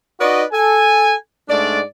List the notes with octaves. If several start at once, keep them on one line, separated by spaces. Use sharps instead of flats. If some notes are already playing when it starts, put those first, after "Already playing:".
D#4 F#4 B4 D5 D#5
A4 G#5
G#2 A3 D4 D5